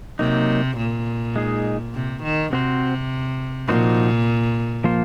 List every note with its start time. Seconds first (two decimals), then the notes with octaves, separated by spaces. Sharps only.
0.19 C3 F#3 A#3 D#4
0.78 A#2
1.36 G#3 D#4 G#4
1.94 C3
2.23 D#3
2.52 C3 C4 F#4 C5
3.68 A#2 F3 A#3 D#4 F#4 C5
4.84 F3 A#3 F4 C5